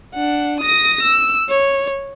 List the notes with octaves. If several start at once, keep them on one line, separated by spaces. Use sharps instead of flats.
D4 F#5
D#6 A#6
E6
C#5